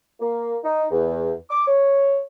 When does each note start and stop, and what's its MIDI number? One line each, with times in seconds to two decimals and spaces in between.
0.20 0.56 58
0.63 0.84 63
0.90 1.32 40
1.49 1.64 86
1.67 2.19 73